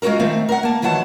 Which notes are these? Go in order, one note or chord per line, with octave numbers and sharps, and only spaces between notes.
G#3 F4 F#4 A4 A#4
D#3 A3 C4
A#4 F#5
A#3 A5
D2 D#3 E3 F#3 F#5 A5